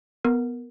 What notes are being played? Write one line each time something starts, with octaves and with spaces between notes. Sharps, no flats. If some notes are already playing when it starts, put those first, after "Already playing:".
B3 A#4